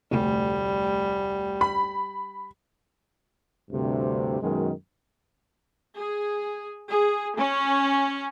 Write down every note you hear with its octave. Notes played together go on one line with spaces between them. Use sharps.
F1 D2 G3
B5
D2 G2 C3
F#2 B2 D#3 G#3
G#4
G#4
C#4